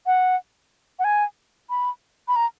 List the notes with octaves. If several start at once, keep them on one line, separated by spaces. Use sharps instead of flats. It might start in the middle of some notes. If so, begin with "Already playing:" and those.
F#5
F#5
G#5
B5
B5
A#5